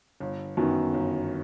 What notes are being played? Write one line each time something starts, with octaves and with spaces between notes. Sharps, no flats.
G1
F#2 D#3 F#3 B3
G1